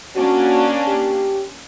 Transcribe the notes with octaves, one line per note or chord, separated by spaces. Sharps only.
A#3 C#4 D4 F#4
G4